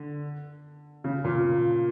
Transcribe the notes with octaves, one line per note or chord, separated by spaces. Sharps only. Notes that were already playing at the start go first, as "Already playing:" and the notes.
Already playing: D3
C#3
A#2